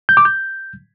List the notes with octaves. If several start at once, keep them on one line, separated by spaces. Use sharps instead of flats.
G6
D6
G6